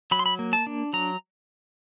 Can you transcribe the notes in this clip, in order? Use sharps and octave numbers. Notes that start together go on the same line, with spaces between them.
F#3 B5
C6
B5
A#3
A5
D4
F#3 A#5